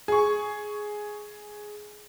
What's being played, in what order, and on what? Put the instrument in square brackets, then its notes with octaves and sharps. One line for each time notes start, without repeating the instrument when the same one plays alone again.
[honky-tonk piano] G#4 C#6